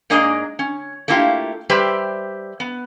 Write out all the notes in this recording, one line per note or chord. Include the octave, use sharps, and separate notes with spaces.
G#2 A#3 D4 G#4 D#5 A#5
C#4
A3 A#3 E4 F4 G4
G3 G4 B4 C5 D5 E5
B3